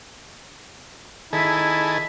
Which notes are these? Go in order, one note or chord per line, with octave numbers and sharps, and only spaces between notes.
D#3 E4 G#4 A4